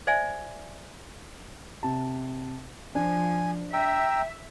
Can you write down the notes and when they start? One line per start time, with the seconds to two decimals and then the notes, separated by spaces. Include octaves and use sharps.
0.07 C5 D5 E5 G#5
1.83 C3 A5
2.95 F3 D4 G#5
3.73 E5 G5 A#5 E6